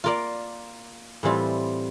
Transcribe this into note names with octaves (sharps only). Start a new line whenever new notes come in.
A#3 F4 A#4 D5
A2 E3 G3 C4 F4